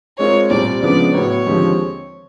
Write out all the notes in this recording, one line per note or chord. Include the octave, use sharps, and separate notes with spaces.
G#3 C4 F4 A#4 C#5
C2 A#2 G3 C4 D5
C#3 F3 G#3 B3 D4 D5
A2 F#3 B3 C#5
D#2 D3 F3 G#3 C4